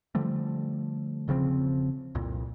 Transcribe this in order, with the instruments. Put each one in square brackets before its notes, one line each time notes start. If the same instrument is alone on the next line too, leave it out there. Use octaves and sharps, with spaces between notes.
[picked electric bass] D3 F3 G3 A3
E1 C#3 F3 C4
C2 F2 A#2